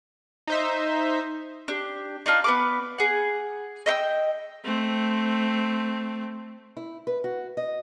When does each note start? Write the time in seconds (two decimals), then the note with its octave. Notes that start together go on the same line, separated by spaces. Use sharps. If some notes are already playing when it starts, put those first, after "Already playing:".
0.47 D#4 C5 E5
1.68 D4 G4
2.26 D4 D#4 F4 A5
2.44 B3 B4 D6
2.98 G#4 F#5
3.86 D#5 E5 G5 E6
4.64 A3 C4
6.77 E4
7.07 B4
7.24 F#4
7.57 D#5